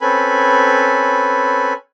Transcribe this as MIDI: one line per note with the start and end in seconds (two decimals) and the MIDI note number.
0.01 1.73 60
0.01 1.73 61
0.01 1.73 69
0.01 1.73 71
0.01 1.73 80
0.01 1.73 83